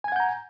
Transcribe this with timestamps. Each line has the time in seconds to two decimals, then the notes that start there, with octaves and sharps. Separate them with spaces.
0.04 G#5
0.08 G#6
0.12 F#5
0.16 G6
0.20 A#5